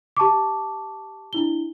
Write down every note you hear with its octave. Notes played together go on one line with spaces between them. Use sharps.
G4 A5 C#6 D6
D4 E4 G7